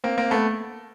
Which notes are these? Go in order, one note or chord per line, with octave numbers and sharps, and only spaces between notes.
A#3 C4
A#3 C4
A3 B3